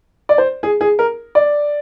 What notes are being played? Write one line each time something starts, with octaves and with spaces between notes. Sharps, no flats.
D5
C5
G#4
G#4
A#4
D5